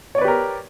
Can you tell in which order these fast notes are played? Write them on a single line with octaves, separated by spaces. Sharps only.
C#5 D5 B4 G4 A#4